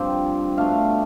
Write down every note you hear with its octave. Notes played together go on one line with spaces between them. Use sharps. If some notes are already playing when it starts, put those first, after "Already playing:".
Already playing: G2 F3 C4 G5
B2 A3 D4 F5